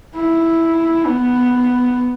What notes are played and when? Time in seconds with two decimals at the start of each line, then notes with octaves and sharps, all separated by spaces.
0.16 E4
1.06 B3